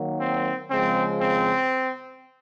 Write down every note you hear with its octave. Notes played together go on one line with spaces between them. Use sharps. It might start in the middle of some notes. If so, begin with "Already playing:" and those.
Already playing: D#3 F#3 A#3
C4
C#3 F3 G#3 C4
C4